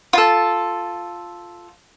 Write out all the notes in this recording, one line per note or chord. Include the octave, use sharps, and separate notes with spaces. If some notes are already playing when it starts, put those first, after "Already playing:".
F4 A4